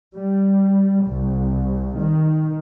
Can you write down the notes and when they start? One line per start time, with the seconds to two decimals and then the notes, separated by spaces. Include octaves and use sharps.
0.15 G3
1.08 C2
1.99 D#3